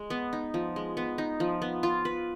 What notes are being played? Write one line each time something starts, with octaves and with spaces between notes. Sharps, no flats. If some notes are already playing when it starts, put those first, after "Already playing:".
Already playing: G#3
B3
D#4
F3
G#3
B3
D#4
F3
B3
F4
B4